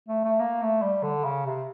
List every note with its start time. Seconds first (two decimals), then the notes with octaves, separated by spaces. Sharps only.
0.09 A3
0.25 A3
0.40 A#3
0.62 A3
0.82 G3
1.03 D3
1.24 C#3
1.46 C3